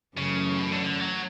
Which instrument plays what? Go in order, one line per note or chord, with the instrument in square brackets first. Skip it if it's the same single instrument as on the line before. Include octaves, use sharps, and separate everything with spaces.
[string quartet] F#2 E3 A3 C#4 [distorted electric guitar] C#3
[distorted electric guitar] B2
D3
D3
F#3